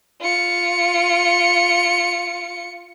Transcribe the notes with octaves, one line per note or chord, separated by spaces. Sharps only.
F4 C#7